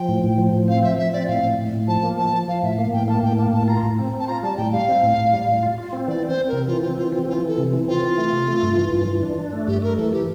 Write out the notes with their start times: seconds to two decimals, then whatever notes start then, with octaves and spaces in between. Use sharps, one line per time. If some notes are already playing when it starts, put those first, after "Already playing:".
Already playing: F3 G5
0.09 A2
0.24 A2
0.38 F3
0.53 A2
0.68 C4 F5
0.83 F3 E5
0.98 F3 E5
1.13 C4 D5
1.28 A2 F5
1.43 A2
1.58 A2
1.73 A2
1.88 F3 A5
2.03 A#3
2.18 F3 A5
2.33 F3
2.48 F3 F5
2.63 A2 E5
2.78 A#3 F5
2.93 A2 G5
3.08 A#3 A5
3.23 A2 G5
3.38 A#3 A5
3.53 A2 A5
3.68 F4 A#5
3.83 A2
3.99 C4
4.13 C4
4.20 A5
4.28 F4 A#5
4.43 G3 A5
4.57 A2 G5
4.72 G3 F5
4.88 C4
5.03 A2
5.18 A2
5.33 G3
5.48 A2
5.63 F4
5.78 F4
5.93 C4
6.08 E3 D5
6.23 C4 C5
6.38 C4
6.48 C3 A#4
6.67 E3 F4
6.82 C4 F4
6.98 E3 F4
7.13 C4 F4
7.23 G4
7.28 E3 F4
7.43 E3 A4
7.58 C3
7.73 E3
7.88 C4 F4
8.03 E3
8.18 A3
8.33 C3
8.48 A3
8.63 G2
8.78 E3
8.93 G2
9.08 E3
9.23 D4
9.38 D4
9.53 A3
9.67 G2 G4
9.82 A3 A#4
9.97 E3 A4
10.13 E3 G4